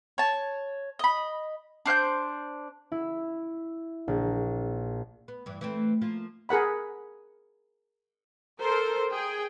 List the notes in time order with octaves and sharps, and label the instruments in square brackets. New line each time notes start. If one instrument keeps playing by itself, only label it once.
[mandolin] C#5 A5
D#5 B5
D4 C5 F#6 G6
[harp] E4
A#1
[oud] B3
G2 E3
E3 A3 C4
F3 A#3 F4
[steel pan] G#4 A#4 F#5 B5
[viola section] A4 A#4 C5
G#4 G5